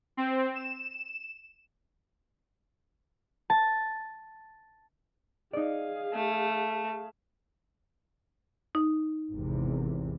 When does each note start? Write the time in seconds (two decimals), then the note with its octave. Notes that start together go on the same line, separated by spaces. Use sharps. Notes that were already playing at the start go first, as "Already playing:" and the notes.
0.17 C4
0.55 E7
3.50 A5
5.53 D#4 G#4 D5 F5
6.13 A3
8.75 D#4
9.32 G#1 E2 C3